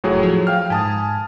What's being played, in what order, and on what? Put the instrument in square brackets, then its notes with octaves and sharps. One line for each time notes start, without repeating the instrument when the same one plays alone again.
[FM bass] F1 [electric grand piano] A2 F#3 G#4
[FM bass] F3
[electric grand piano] F5 G5 F6
[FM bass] G#2 [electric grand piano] G#5 A5 D#6